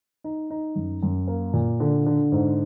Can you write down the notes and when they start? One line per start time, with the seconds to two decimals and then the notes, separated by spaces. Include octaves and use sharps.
0.24 D#4
0.50 D#4
0.75 F#2
1.03 F#2
1.28 A#3
1.53 A#2
1.80 D3
2.06 D3
2.32 G#2